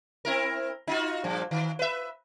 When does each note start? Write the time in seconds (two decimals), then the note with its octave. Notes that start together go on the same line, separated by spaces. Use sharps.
0.25 C4 E4 A#4
0.87 D#4 F4 F#4
1.24 G2 A#2 F3
1.51 D#3
1.79 B4 E5